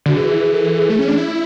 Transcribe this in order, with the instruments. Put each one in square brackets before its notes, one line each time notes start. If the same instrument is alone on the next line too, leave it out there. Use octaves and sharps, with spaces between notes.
[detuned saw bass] D3 [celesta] F#4
[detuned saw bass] E3 [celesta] G#4
[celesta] G#4
G#4
A4
G#4
[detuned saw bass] A3
C#4
D4
E4